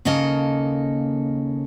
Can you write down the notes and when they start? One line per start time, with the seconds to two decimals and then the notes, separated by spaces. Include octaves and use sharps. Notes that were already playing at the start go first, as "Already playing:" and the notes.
0.05 D#2 C#3 A#3 A4 D#5